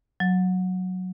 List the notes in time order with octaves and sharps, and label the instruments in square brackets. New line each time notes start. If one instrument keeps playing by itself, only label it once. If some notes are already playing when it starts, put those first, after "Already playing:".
[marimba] F#3